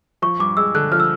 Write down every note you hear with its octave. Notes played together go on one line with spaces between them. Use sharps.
F3 C#6
G2 D6
G#3 E6
D3 F#6
F3 F6
E6